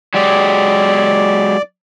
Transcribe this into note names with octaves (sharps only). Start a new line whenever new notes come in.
F#3 G#3 G4 D5